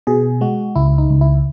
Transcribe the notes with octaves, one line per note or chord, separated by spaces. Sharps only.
B2 G#4
G#3 F#4
C#2 E4
D#4
C#2
E4